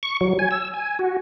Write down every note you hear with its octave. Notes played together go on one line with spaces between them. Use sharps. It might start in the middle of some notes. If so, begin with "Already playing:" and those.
C#6
F#3
G#5
E6
G#5
F#4